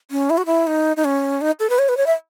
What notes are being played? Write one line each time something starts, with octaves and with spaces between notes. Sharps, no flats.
C#4
E4
F#4
E4
D#4
D#4
C#4
D#4
A4
B4
C#5
B4
C#5
E5